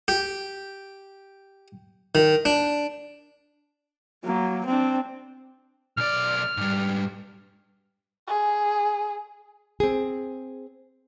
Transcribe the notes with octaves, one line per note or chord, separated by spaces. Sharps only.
G4
D#3
D4
F#3 A#3
C4 D4
B1 D5 F6
G#2 G3
G#4
C4 G#4